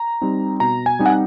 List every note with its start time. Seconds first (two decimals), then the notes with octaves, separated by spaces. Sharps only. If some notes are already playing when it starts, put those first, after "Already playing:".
Already playing: A#5
0.21 G3 C4 D#4
0.60 B2 A#5
0.86 G#5
0.99 G3 C4 D#4
1.06 F#5